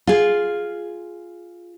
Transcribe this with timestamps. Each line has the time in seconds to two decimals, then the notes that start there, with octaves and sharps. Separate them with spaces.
0.07 F4 G#4